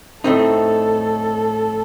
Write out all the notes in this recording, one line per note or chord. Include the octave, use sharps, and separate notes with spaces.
A2 A3 C4 D#4 A4